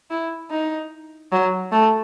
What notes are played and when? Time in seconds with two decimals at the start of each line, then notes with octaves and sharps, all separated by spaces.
0.11 E4
0.50 D#4
1.32 F#3
1.72 A3